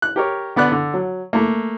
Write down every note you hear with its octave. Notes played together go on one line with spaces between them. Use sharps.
F#6
G4 A#4 C#5
D3 B3 D5 F#6
D3
F#3
A3 A#3